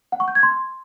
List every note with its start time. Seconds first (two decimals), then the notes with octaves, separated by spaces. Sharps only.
0.12 F#5
0.20 C#6
0.28 G6
0.35 G#6
0.43 C6